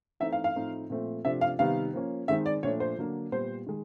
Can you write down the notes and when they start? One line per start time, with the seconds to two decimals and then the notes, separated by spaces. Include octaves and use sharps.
0.20 E3 A3 C4 D#4 E5
0.32 F5
0.44 F5
0.55 A2 F3 A3 C4 D#4
0.90 A#2 F3 A3 C4
1.25 C3 F3 A3 D4 E5
1.41 F5
1.59 C3 D#3 G3 B3 D#4 F5
1.93 F3 A#3 C#4
2.28 D#3 G#3 C4 D#4 E5
2.46 D5
2.63 A#2 F3 A3 D4 C#5
2.80 C5
2.97 D3 F#3 A#3 D4
3.32 A#2 G3 B3 C5
3.66 D#3 G#3